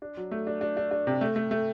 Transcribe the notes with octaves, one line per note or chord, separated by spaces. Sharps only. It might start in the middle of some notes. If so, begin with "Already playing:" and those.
D4
F#3
A3
D4
D4
D4
D4
C3
A3
A3
A3